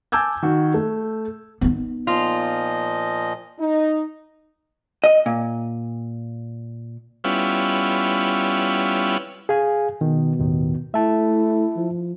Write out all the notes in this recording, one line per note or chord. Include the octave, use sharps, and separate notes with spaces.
G#5 A5 D6 E6 G6 G#6
D#3 F#4
A3
B3 D#4
A#2 F3 F4 D#5
D#4
D#5
A#2
G3 B3 C#4 E4 F4
G#4 F5 G#5
B2 D#3
D#2 A2 D#3
A3 E4 E5 A5
F3